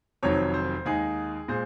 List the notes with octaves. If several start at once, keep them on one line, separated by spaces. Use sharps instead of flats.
F1 F2 D#3 F#3 C#5
C5
D#2 D#3 G#3 D#4 G#4
A#2 G#3 C5